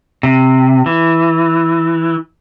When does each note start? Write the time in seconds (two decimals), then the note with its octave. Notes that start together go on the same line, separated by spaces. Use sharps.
0.23 C3
0.86 E3